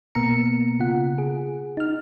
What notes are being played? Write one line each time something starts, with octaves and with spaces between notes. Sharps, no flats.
B2 A#3 B3 A#5 C#7
C#3 F4 F#5
G#4
D#4 F6